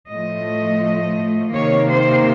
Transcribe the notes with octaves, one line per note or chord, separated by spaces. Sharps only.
A2 F3 A3 D#5
C3 D#3 A#3 C#5
C5